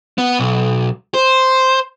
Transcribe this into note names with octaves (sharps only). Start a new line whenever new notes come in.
B3
B1
C5